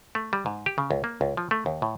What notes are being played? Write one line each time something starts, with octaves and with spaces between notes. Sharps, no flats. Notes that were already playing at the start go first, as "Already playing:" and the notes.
A3
G3
G#2
G4
C#3
C#2
A#3
C#2
F3
A3
D#2
A2